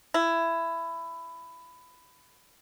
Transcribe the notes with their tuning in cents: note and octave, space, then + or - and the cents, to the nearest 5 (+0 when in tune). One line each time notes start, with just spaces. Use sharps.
E4 +15